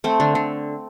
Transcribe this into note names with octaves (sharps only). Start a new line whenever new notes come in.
A3 C4
D3
D3